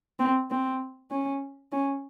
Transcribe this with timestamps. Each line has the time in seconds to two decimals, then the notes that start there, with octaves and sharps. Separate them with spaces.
0.19 C4
0.50 C4
1.11 C#4
1.72 C#4